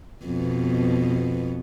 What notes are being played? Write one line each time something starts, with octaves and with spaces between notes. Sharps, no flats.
F2 B2 B3